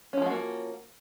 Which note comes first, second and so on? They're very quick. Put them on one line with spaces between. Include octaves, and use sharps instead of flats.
C#4 F3 G#3 F#4 A#3